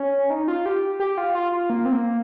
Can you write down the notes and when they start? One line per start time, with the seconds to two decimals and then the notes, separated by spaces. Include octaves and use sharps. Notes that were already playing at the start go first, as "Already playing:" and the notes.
Already playing: C#4
0.30 D#4
0.48 F4
0.66 G4
1.00 G4
1.17 F4
1.34 F4
1.52 F4
1.70 A#3
1.85 C4
1.93 A#3